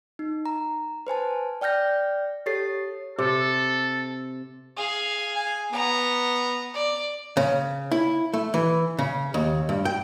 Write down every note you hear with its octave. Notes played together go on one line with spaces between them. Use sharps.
D#4
A#5
B4 C5 G#5 A5
D5 G5 F6 G6 A#6
G4 A4 C#5 A6 C7
C3 A4
G#4 F5
G#5
B3 A#5
D5
C#3
E4
A3
E3
C#3
D#2
G2
G5